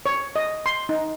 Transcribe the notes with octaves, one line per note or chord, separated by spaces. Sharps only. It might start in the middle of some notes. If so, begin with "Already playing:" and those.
C#5
D#5
C6
D#4